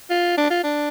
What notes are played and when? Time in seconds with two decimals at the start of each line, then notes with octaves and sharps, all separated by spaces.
0.10 F4
0.37 D4
0.50 F4
0.64 D4